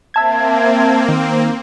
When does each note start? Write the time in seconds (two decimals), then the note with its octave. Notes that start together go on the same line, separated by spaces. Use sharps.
0.14 A#3 C4 E5 A5 G#6
1.08 D#3